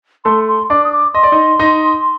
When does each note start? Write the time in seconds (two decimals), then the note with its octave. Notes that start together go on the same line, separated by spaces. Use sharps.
0.25 A3 A4 C6
0.48 C6
0.69 D4 D5 D6
0.84 D#6
0.92 D6
1.14 D#5 C6
1.23 D5
1.32 D#4 D#5
1.59 D#4 D#5